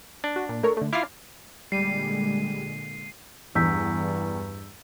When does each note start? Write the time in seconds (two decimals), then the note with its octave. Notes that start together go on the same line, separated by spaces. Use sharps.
0.24 D4
0.36 F#4
0.49 A#2
0.63 A3 A#4 C#5
0.77 D3 A3
0.93 E4 F4 D6 F6 C7
1.72 A#2 D3 G3 G#3 C7 D#7
3.55 E2 G2 E6 G6 B6